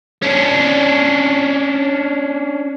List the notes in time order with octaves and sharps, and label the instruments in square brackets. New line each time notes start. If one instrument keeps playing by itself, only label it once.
[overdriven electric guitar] C#4 D4